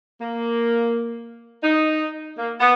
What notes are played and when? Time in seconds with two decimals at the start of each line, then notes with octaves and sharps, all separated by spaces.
0.21 A#3
1.64 D#4
2.38 A#3
2.60 B3